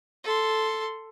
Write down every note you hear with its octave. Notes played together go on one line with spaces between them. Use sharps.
A4 C6